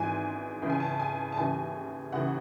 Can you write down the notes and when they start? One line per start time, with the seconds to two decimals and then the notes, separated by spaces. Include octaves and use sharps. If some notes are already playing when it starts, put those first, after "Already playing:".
Already playing: G#1 G#2 E3 G#5
0.62 C#2 C#3 E3
0.70 G#5
0.80 A5
1.00 G#5
1.32 A5
1.37 D#2 C#3 E3 G#5
2.12 D#2 C#3 E3 F#5